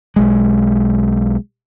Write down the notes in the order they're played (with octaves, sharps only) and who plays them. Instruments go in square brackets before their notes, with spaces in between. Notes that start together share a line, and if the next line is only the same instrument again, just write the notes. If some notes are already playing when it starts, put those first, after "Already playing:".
[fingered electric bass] B1 G#3